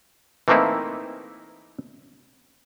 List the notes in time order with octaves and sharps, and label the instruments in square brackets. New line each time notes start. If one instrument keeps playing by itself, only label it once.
[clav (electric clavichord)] E3 A3 A#3 C4 D#4 E4